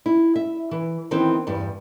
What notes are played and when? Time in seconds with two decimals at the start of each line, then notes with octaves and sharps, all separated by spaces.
0.06 E4
0.36 E5
0.71 E3
1.11 D#3 E3 B3 C4 E4
1.47 E2 G2